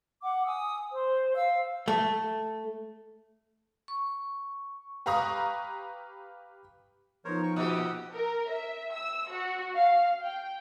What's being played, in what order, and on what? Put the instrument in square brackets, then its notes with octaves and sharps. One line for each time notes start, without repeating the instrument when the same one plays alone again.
[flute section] F#5 D6
G#5 D#6 E6
C5
F5 E6
[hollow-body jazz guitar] A3
[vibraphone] C#6
[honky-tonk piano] G4 B4 F5 A#5 C#6 D#6
[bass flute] F3 [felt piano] B3 D#4 [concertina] A#4 C5 C#5
[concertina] G5 C#6
[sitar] A#2 G4 [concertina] F#5 D#6 E6
[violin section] A#4
E5
E6
F#4
F5
G5